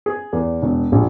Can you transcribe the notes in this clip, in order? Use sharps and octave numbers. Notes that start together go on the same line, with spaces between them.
G#4
E2
E1
A#1